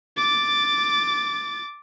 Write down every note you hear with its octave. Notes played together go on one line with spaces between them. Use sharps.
D6 A6